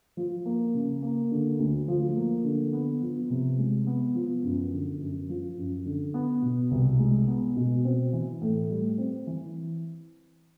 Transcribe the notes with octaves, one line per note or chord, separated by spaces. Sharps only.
F3
A#3
C#3
A#3
D3
D2
F3
A#3
D3
B3
F3
C3
G#3
B3
F3
F#2
D3
F#2
F3
F#2
D3
B3
B2
C2
G#3
B3
B2
C4
E3
A2
G3
C4
E3